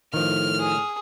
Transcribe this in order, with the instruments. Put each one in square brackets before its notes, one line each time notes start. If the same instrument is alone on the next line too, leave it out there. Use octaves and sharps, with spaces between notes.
[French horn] A2 [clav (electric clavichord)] D#3 F3 [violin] F6
[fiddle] G#4